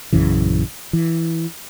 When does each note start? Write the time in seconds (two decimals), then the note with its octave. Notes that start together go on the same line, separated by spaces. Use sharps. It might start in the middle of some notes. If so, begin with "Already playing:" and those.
0.13 A#1 F#2 C#3 E3
0.93 E3